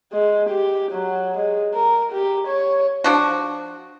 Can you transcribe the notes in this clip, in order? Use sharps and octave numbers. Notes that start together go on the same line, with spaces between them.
G#3
G4
F#3
G#3
A#4
G4
C#5
F3 D4 F#4